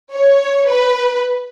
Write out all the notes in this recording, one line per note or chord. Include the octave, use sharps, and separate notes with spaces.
C#5
B4